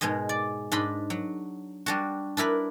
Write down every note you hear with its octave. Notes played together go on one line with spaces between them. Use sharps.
G#2 B2 G#3 G#4 D#5
D5
G#2 D4 D#5 B5 C6
F#3
G3 D4 F#4
D4 E4 A#4 B4